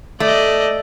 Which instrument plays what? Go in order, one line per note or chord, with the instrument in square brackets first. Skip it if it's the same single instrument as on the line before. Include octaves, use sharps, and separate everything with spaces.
[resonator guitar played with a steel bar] A3 [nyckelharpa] D5 D#5